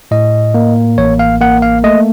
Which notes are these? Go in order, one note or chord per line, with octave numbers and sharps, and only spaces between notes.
A2 D#5
A#3
A1 C#5
F5
A#3 F#5
F5
A3 D#5